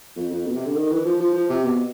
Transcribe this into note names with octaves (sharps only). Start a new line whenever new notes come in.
F2
F2
B2
C3
D3
D#3
E3
F3
F3
F3
C3
B2